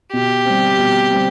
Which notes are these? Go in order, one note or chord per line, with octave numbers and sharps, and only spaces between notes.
B2 G4
G3 C4
B2
G3 C4